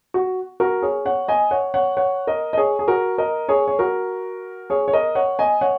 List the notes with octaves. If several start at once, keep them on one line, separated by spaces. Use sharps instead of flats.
F#4
F#4 A#4
G#4 C#5
C#5 F#5
D#5 G#5
C#5 F#5
C#5 F#5
C#5 F#5
A#4 D#5
D#5
G#4 C#5
G#4
F#4 A#4
A#4 D#5
G#4 C#5
C#5
F#4 A#4
G#4 C#5
C#5
A#4 D#5
C#5 F#5
D#5 G#5
C#5 F#5